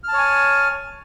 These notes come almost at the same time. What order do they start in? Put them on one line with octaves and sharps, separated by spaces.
F6 A5 C#5 G#5